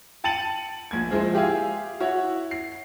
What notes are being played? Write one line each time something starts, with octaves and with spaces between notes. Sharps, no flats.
G5 A5 A6 C#7 D#7 F#7
A#1 G#6
F3 G#3 E4 C5
F4 G4 G#4 E5 F5 G#5
E4 F#4 C#5 E5
C7